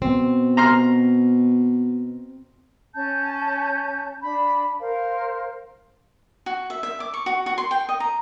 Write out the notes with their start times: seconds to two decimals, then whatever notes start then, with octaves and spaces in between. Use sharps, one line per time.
0.02 B2 C4
0.57 A#5 C6 F6
2.94 C#4 A5 G6
4.23 D4 B5
4.79 A#4 C5 F5
6.46 F#4
6.70 E5
6.83 E5
7.00 D6
7.14 C#6
7.26 F#4
7.46 F#4
7.58 C6
7.71 G5
7.89 D#5
8.00 A#5